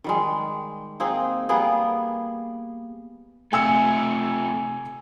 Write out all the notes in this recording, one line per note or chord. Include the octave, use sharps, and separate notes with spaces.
D#3 G3 G#3
A#3 C4 D#4 G#4
G3 A#3 B3 G#4
C3 A3 G#5 E6 C#7